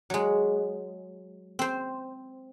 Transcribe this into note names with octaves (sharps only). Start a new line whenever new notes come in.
F#3 G#3
C4 C5